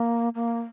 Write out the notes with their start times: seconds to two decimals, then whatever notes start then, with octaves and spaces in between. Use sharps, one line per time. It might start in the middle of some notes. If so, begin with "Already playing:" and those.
Already playing: A#3
0.35 A#3